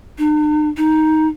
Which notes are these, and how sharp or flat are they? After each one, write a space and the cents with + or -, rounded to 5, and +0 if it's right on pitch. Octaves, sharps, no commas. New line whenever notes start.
D#4 -45
D#4 +10